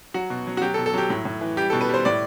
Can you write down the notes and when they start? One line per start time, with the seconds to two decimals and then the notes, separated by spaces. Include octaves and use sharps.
0.14 F#3 F#4
0.30 B2
0.47 F#3
0.57 F#4
0.62 F#3 G4
0.74 A4
0.78 B2
0.86 A4
0.94 F#3 G4
1.10 A2
1.25 A2
1.41 E3
1.57 G3 G4
1.70 B2 A4
1.81 B4
1.89 G3 C5
2.05 A2 D5